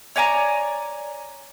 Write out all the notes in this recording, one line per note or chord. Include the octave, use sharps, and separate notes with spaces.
C#5 D5 G#5 A#5